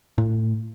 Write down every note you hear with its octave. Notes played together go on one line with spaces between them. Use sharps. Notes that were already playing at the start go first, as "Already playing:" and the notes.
A2